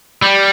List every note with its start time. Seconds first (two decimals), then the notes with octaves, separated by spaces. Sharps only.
0.22 G3